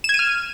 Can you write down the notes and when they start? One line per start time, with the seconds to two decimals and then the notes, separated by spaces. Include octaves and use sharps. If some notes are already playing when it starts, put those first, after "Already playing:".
0.04 E7
0.09 G#6
0.14 D#7
0.19 F6